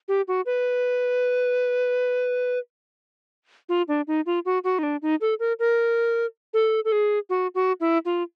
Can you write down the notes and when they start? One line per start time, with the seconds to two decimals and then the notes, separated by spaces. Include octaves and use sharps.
0.08 G4
0.28 F#4
0.46 B4
3.69 F4
3.88 D4
4.07 D#4
4.26 F4
4.45 F#4
4.64 F#4
4.79 D#4
4.83 D4
5.02 D#4
5.21 A4
5.40 A#4
5.59 A#4
6.54 A4
6.85 A4
6.92 G#4
7.30 F#4
7.55 F#4
7.80 E4
8.05 F4